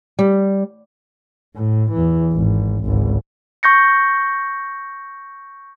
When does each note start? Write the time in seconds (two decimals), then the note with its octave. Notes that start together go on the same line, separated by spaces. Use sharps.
0.19 G3
1.56 A2
1.92 E2 E3
2.33 G#1
2.85 G#1 C#2
3.63 C#6 G6 A#6 C#7